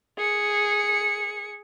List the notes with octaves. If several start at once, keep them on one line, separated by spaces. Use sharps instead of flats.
G#4 C#7